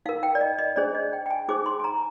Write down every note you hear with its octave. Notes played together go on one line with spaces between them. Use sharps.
D#4 A#4 F5
G5
D5
D#5
D#5
D4 G#4 C5 D5
D#5
G5
G5
G#5
D#4 G#4 C5 D6
C6
G#5
A#5